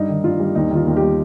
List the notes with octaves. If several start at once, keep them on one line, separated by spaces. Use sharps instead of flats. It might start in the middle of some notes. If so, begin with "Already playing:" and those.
Already playing: G2 D#4
D#3
G2 F4
G3
D#2 D#4
D#3 F4
D#2
G3 G4